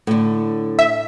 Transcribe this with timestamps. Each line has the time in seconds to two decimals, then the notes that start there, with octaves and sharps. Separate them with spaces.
0.07 A2 D3
0.79 E5